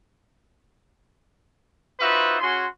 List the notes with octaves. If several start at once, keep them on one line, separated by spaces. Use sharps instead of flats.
D#4 F4 F#4 B4 C5 E5
C#4 F#4 G#4 C6